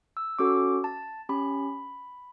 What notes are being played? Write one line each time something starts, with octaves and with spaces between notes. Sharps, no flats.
E6
C#4 F#4 A4 D6
A5
C#4 G4 B5